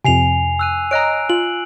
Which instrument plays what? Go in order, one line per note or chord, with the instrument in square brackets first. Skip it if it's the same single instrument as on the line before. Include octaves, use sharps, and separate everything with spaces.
[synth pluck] F2 C3 [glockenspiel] G#5 C7 F7
[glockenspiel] E6 F#6 D#7
[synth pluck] C#5 D#5 A#5 [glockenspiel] F#6 D7
[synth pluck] F4 [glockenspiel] F#7